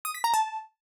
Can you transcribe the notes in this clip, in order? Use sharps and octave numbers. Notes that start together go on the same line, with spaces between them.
D#6
B6
A#5
A5